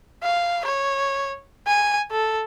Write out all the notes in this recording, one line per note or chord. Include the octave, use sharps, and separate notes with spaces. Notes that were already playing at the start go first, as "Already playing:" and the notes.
F5
C#5
G#5
A4